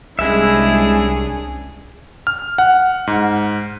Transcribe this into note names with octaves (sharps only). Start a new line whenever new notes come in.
C2 G#3 C#4 D4 E4 G#4 E5
F6
F#5
G#2